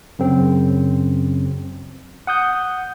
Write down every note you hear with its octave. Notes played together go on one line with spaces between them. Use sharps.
F#2 C#3 C4
F#5 D#6 G6